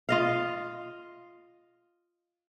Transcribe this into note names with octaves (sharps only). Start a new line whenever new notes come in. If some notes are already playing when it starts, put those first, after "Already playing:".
F4 D#5 F5